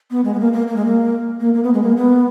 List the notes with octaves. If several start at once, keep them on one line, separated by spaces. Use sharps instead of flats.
B3
G#3
B3
A#3
A#3
A#3
G#3
A#3
A#3
A#3
B3
G#3
A#3
B3